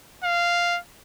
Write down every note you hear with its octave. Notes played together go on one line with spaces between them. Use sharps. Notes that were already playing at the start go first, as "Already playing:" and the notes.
F5